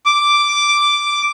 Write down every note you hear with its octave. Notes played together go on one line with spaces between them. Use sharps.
D6